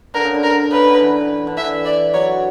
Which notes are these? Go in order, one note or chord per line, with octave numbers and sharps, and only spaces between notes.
D3 A#4
C#3
D3
A#4
C#3 B4
D3
E3
D3
E3 E5
D5
F#3 C#5